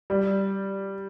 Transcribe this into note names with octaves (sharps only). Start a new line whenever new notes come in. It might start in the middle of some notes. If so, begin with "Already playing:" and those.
G3